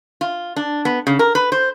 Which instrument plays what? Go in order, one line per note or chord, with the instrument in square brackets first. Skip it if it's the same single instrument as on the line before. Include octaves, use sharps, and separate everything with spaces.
[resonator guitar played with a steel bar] F4
D4
B3
C#3
A#4
B4
C5